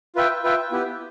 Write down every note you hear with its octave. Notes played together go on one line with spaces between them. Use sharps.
F4 B4 E5 G5
F4 B4 E5 G5
B3 E4 G4 B4